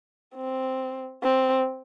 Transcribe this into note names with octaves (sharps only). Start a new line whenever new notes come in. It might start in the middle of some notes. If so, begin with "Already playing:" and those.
C4
C4